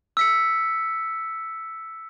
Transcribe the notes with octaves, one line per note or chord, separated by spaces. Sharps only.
E6 B6 C#7